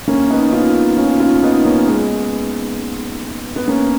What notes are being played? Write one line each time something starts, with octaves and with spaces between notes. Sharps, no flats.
A#3 C#4
B3 D#4
C#4 F4
C#4 F4
C#4 F4
B3 D#4
A#3 C#4
G#3 B3
B3
A#3 C#4